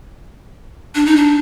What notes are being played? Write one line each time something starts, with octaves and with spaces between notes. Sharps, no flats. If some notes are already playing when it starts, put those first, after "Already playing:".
D4
D#4
D4